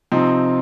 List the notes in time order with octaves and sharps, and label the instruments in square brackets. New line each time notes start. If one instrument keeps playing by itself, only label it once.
[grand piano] C3 F3 C4 D#4